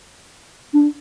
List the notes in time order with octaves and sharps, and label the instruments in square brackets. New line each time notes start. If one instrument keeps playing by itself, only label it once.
[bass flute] D4